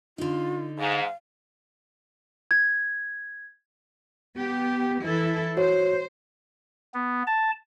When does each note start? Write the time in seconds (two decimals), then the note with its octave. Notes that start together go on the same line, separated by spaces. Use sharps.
0.18 D3 D#4 F4
0.79 G#2 F5
2.51 G#6
4.36 B3 G4
5.03 E3 E4 A4
5.57 F#4 C5 C#5
6.94 B3
7.27 A5